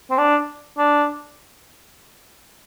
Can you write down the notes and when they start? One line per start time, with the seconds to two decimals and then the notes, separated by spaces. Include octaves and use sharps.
0.10 C4
0.18 D4
0.78 D4